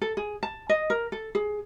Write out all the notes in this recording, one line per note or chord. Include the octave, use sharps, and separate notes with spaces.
A4
G#4
A5
D#5
A#4
A4
G#4